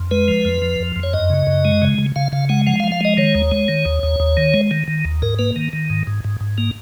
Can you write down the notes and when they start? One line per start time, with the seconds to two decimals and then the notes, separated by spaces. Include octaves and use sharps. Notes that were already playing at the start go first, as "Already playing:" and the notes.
Already playing: F2
0.11 G#3 B4
0.28 F3
0.45 F2
0.62 F3
0.80 F2
0.96 F2
1.03 C#5
1.13 F#2 D#5
1.30 C#3
1.47 F#2
1.65 G#3
1.82 C#3
1.98 C#3
2.16 C#3 F5
2.32 C#3 F5
2.49 G#3 F#5
2.67 F3 F#5
2.80 F5
2.84 F3
2.92 F5
3.01 G#3 D#5
3.17 D#3 C#5
3.35 D#2
3.52 G#3
3.68 D#3
3.85 D#2
4.03 D#2
4.20 D#2
4.37 D#3
4.54 G#3
4.71 D#3
4.88 D#3
5.05 D#2
5.22 G#2 A#4
5.39 A#3 B4
5.56 D#3
5.73 D#3
5.90 G#2
6.07 G#2
6.24 G#2
6.41 G#2
6.58 A#3